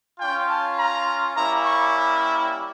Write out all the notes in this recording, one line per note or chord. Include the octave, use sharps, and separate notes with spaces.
C#4 F4 G5
A5
A#5
G3 A#3 C#4 E4 A#5
C#6